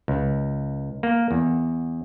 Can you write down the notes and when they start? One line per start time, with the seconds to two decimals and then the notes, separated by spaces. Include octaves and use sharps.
0.08 C#2
1.03 A#3
1.31 E2